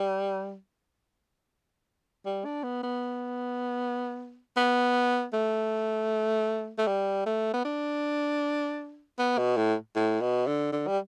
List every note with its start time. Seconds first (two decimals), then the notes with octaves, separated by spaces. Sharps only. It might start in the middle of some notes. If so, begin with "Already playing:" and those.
Already playing: G3
2.25 G3
2.45 D4
2.63 B3
2.83 B3
4.57 B3
5.33 A3
6.78 A3
6.87 G3
7.26 A3
7.54 B3
7.65 D4
9.18 B3
9.38 B2
9.57 A2
9.95 A2
10.21 B2
10.47 D3
10.72 D3
10.87 G3